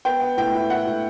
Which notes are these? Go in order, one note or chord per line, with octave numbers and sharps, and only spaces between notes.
B3 G5
B3
A2 G5
E4
E4 F#5
A2